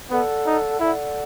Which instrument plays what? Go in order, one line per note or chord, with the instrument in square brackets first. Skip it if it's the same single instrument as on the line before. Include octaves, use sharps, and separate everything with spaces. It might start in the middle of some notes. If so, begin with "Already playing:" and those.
[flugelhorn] B3 [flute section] A4 D5 F#5
[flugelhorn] D#4
[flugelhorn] E4 [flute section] A4 D5 F#5